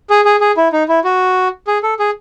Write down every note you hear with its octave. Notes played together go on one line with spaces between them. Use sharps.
G#4
G#4
G#4
E4
D#4
E4
F#4
G#4
A4
G#4